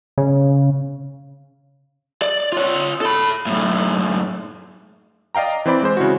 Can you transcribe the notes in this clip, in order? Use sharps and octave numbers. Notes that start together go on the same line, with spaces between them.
C#3
D5
F4 C#5
A4 B5
F#2 A2
D5 D#5 F5 G5 A#5
E3 C4 C5 D5 B5
G#3 C5
C#3 E4 F#4